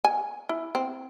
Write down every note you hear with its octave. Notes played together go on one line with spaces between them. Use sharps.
G#5
E4
C4